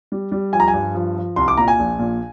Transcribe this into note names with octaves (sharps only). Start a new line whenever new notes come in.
G3
G3
F3 G#5
A#5
G#5
G2
F3
F3
C2 C6
D6
A#2 A#5
G#5
A#1
A#2